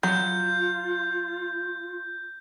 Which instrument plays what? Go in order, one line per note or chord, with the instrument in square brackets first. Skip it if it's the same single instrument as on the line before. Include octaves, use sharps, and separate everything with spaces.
[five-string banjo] F#3 [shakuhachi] F4 [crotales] G6